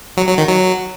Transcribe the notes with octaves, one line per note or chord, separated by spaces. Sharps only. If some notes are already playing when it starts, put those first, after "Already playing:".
F#3
F#3
D#3
F#3